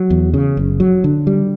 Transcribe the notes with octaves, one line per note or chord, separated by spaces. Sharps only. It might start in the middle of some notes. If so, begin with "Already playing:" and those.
Already playing: F#3
E2
C#3
F#1
F#3
D3
G3